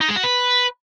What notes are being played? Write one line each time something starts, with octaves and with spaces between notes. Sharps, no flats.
D#4
G#3
F#4
B4